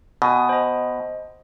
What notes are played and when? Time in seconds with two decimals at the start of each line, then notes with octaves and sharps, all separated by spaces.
0.22 B2 G#5 D#6
0.49 C5 D#5